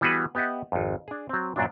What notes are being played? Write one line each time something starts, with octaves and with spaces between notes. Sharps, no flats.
E3 G3 B3 F#4 G#4 B4
B3 G4 D#5 E5 F#5
G#1 F2
D4 G#4
F#3 C4
F#2 A#2 F#3 D4